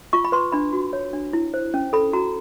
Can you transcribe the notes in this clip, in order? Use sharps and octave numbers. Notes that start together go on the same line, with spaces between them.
F4 C#6
B5
B4 C6
D4 B5
F#4
C#5
D4
E4
C5
C#4
A4 B5
F#4 A#5